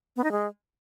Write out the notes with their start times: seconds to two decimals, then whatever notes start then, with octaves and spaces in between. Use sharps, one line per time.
0.16 B3
0.24 D#4
0.32 G#3